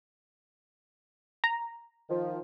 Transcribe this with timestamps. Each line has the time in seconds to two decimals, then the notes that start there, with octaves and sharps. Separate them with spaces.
1.44 A#5
2.09 D#3 F3